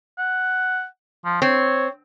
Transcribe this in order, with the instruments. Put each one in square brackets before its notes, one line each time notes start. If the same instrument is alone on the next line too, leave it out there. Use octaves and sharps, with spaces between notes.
[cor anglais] F#5
F3
[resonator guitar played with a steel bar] C4 [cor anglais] C#5